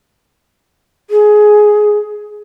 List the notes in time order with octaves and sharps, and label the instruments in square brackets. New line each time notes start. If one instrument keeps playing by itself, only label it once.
[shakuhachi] G#4